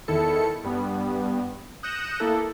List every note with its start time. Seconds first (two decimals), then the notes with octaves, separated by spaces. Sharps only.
0.08 E2 D#3 E4 A4 C#7
0.64 G2 G3 B3
1.83 D#6 F#6 G6 A#6 C#7 E7
2.20 A#3 E4 A4